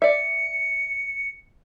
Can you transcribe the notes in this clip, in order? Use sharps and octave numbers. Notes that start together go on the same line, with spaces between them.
D5 E5 C#7